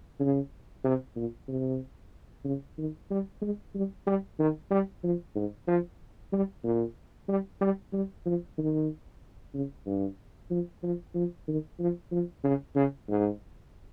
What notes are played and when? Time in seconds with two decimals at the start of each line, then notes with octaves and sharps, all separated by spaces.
0.19 C#3
0.84 C3
1.16 A#2
1.48 C3
2.45 C#3
2.78 D#3
3.10 G3
3.41 G#3
3.75 G3
4.07 G3
4.39 D#3
4.71 G3
5.04 F3
5.36 G#2
5.68 F3
6.32 G3
6.64 A#2
7.28 G3
7.61 G3
7.93 G3
8.26 F3
8.58 D#3
9.54 C#3
9.86 G2
10.50 F3
10.83 F3
11.15 F3
11.48 D#3
11.79 F3
12.12 F3
12.44 C#3
12.76 C#3
13.09 G#2